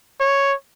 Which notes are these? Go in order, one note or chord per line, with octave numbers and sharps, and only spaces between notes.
C#5